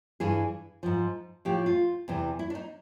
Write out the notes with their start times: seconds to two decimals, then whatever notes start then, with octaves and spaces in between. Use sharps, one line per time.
0.20 G2 E3 G#4
0.83 G#2 F3
1.45 A2 F3 G4
1.66 F4
2.08 E2 C3 E3
2.39 E4
2.50 D4
2.55 D#4